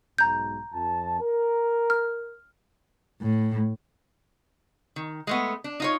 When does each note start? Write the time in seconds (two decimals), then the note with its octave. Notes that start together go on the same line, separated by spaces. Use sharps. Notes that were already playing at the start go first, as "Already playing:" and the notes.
0.18 B1 G#2 A#5 G6
0.73 F2 A5
1.20 A#4
1.90 F6
3.22 A2
4.96 D#3
5.27 G#3 A3 B3
5.64 D4
5.80 D#4 F4 C#5